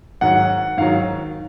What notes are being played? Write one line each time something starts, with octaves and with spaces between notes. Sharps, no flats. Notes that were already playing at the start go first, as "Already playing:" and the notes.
G#2 D#3 F#3 F#5
G#2 D#3 F#3 F5